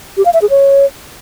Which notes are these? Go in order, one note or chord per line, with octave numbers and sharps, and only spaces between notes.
G4
F5
E5
G#4
C#5